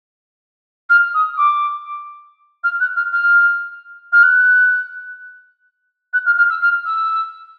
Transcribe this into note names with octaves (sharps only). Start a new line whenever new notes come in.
F6
D#6
D6
F6
F#6
F6
F6
F6
F#6
F#6
F6
F6
E6
F6
E6